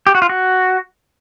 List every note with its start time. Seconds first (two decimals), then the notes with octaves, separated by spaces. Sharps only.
0.07 G4
0.15 F#4
0.22 F4
0.29 F#4